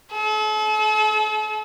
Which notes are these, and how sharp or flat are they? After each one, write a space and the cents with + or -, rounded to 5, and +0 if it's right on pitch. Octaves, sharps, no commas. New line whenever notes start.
A4 -40